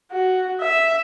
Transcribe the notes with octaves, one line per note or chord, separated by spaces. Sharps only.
F#4
E5